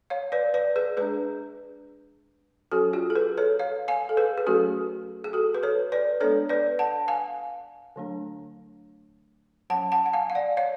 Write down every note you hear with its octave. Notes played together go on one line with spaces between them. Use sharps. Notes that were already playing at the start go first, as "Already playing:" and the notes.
C#5 F5
B4 D5
B4 D5
G#4 B4
G#3 D4 G#4 B4
F#3 C#4 F#4 A4
F4 G#4
A4
G#4 B4
A4 C#5
C#5 F5
F5 G#5
A4
G#4 B4
G#4
F#3 A3 C#4 F#4 A4
G#4
F#4 A4
B4
A4 C#5
B4 D5
G#3 B3 D4 A4 C#5
B4 D5
F#5 A5
F5 G#5
D3 F#3 A3 D4
F#3 C#4 F#5 A5
F#5 A5
F#5
F5 G#5
F5
D5 F#5
C#5 F5